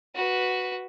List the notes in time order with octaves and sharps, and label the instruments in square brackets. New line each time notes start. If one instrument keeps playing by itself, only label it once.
[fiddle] F#4 B4